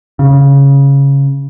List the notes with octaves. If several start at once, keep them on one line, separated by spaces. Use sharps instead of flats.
C#3